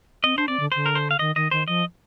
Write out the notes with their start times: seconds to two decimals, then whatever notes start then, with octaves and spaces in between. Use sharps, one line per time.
0.24 C4 D#5
0.37 D4 C5
0.48 C4 D5
0.60 D3
0.72 D3 C5
0.86 A#4
0.95 C5
1.11 F5
1.19 D#3 D#5
1.36 D#3 D#5
1.51 D#3 C5
1.68 F3 D#5